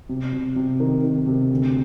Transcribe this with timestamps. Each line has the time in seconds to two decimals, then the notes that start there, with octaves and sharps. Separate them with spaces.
0.09 C3
0.33 C3
0.56 C3
0.80 D#3
1.04 D#3
1.27 C3
1.51 D2